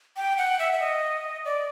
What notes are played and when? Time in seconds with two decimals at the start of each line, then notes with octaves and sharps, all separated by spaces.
0.17 G5
0.38 F#5
0.59 E5
0.72 E5
0.80 D#5
1.45 D5